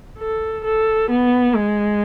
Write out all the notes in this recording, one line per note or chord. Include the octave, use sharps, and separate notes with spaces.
A4
A4
B3
G#3